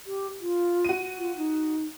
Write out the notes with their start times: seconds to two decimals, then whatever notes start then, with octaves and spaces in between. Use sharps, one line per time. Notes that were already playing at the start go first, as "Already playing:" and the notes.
0.06 G4
0.41 F4
0.85 F#4 D#7
1.18 F4
1.37 D#4